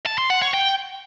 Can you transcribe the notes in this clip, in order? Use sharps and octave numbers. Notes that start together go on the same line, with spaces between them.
A5
C6
F#5
C#5
G5